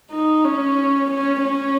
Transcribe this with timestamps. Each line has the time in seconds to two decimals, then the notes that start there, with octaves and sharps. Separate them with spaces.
0.11 D#4
0.44 C#4
1.11 C#4
1.44 C#4